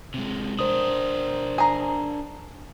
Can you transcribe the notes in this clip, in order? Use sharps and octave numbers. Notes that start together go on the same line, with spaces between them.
C3 G#3
D4 A#4 C5 D#6
G#4 A#5